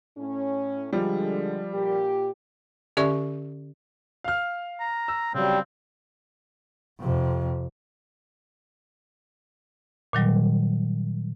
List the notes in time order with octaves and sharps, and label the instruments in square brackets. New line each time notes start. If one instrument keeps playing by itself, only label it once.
[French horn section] A2 C#4
[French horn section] D3 G#3 [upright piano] F3 G3
[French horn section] A#2 G4
[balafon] D3 C#4 G4 D5 E5 C#6
[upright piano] F5 F6
[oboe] A#5
[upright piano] E6
[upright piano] C#3 F#3 [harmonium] G3 [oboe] C4
[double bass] F2 C3
[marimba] A#2 D#3 F#3 G3